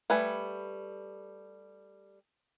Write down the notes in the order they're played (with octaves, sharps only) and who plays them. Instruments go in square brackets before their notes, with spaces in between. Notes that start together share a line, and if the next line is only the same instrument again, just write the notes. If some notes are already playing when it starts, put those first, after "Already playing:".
[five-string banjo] G3 A3 B4 G#5